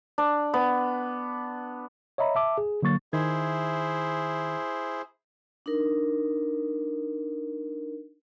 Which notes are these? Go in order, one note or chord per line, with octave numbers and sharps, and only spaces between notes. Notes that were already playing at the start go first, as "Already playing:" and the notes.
D4
B3
C#5 D#5 E5 A#5 B5
E5 A5 D6
G#4
D3 F#3 A#3 C#6 A6
D#3 E4 G#4 C5 E5 G#6
D4 D#4 A#4